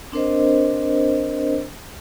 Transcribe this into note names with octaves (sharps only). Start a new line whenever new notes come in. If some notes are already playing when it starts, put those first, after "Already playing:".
C4 D4 A#4 C5 D#5